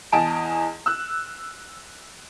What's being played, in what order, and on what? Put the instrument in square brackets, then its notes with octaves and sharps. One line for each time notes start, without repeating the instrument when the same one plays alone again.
[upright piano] E2 D#5 G#5 A5 D7
E6 F#6